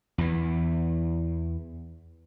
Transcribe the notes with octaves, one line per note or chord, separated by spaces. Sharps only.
E2 E3